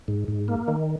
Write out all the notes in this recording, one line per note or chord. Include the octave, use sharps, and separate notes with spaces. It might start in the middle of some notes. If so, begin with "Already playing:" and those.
G#2
G#2
A#3
D#3